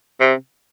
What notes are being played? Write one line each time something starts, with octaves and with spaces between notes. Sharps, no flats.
C3